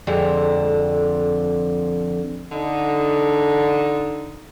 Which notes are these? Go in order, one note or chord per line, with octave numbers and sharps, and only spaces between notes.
F2 D3 G#3
D3 D#4